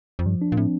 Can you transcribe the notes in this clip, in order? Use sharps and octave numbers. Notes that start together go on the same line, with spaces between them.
F2
G2 F3
D4
A#2
A2 C4